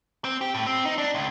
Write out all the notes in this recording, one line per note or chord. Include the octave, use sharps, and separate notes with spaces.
C4
G4
A2
C4
D#4
D4
C#2